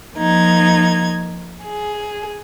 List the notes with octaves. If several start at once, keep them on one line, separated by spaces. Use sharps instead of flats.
F3 A#3 D#4 G#6
G#4